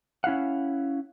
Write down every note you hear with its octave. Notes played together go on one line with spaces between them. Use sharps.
C#4 E4 F5 F#5